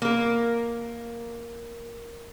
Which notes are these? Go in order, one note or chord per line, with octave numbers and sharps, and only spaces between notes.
A#3 A#4